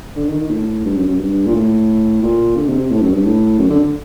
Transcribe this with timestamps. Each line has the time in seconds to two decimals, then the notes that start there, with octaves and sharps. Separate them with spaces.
0.16 D3
0.29 D#3
0.40 D#3
0.51 A2
0.85 G2
0.97 F#2
1.08 F#2
1.20 G2
1.47 A#2
1.54 A2
2.23 A#2
2.56 D3
2.67 C3
2.79 C3
2.91 A2
3.02 F#2
3.14 G2
3.25 A2
3.59 F#2
3.70 D3